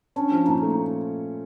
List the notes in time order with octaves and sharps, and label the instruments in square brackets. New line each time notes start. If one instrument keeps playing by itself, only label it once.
[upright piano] C#4 [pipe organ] D4
[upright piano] F3
[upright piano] A#2 [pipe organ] D#4
[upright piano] A3